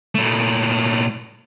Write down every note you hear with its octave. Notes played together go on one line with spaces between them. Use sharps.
A#2 A3